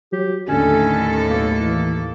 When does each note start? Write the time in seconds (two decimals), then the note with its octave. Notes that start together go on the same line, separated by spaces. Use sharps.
0.13 F#3 G4
0.49 D#2 A2 D3 C#4 A4
1.30 B1 A#3
1.61 E3